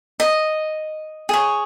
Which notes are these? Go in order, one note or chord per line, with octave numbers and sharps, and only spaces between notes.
D#5
G#4 C#5